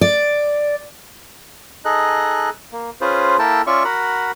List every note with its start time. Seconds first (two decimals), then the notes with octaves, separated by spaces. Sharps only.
0.01 D5
1.85 D#4 G#4 A4 D#5 F#6
2.72 A#3
3.01 C#4 F4 G#4 B4 C5
3.39 A#3 E4 A4 A#4 G5 A5
3.67 C#4 F4 D5 E5 C#6
3.85 F#4 A#4 F#5 B5